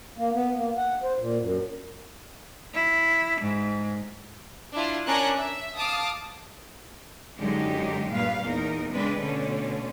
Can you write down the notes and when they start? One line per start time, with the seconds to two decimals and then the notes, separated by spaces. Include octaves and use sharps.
0.18 A#3
0.34 B3
0.57 A#3
0.77 F#5
1.03 C5
1.19 A#2
1.41 F#2
2.74 E4
3.41 G#2
4.73 D4 E4 F4
5.06 C#4 D4 A#4 A#5 F#6
5.35 E5
5.76 F5 A5 D6 D#6
7.39 F#2 D3 G#3 D#4 G4
8.11 G2 A#2 B4 F5
8.42 E2 D#4 A#4
8.92 C#3 G#3 C4 D4 B4
9.23 B2 D3 A3 C#4